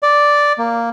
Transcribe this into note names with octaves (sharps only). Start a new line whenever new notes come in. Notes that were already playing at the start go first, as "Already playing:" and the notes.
D5
A#3